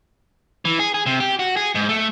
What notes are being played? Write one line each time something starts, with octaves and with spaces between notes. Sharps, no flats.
E3
G#4
G#4
C3
G4
F#4
G#4
G#2
A3